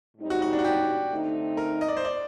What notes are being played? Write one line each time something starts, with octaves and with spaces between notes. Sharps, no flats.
A2 G3 C4 D#4
F#4
F#4
D4
F#4
G4
D3 A3 C4 D#4
A#4
D#5
D5
C5
D5